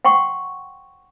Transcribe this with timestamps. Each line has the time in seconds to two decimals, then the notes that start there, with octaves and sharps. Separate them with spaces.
0.05 F#5 G5 C6 C#6